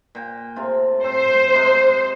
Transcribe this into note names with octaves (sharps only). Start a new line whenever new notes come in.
A#2 G5
A2 C3 F4
C4 C5
C3 G#3 D6